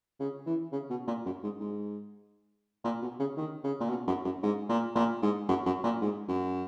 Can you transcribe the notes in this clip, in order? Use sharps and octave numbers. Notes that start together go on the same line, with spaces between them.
C#3
E3
C#3
B2
A#2
F#2
G#2
G#2
A#2
B2
C#3
D#3
C#3
A#2
B2
F#2
F#2
G#2
A#2
A#2
G#2
F#2
F#2
A#2
G#2
F#2